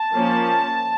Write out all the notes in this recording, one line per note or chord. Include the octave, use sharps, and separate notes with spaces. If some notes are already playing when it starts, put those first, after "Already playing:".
Already playing: A5
F3 A#3 C#4